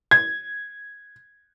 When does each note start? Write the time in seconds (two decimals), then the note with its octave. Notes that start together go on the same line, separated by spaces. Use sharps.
0.11 G#6